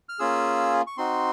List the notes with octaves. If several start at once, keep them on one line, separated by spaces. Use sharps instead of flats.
F6
A#3 C#4 F4 G#4 E6
C#6
C4 D#4 F#4 C6